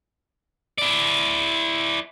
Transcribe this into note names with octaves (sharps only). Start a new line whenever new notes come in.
E4 D5